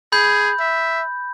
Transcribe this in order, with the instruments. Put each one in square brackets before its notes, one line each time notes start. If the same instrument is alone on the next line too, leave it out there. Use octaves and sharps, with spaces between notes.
[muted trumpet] G#4 [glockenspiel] B5 G6
[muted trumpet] E5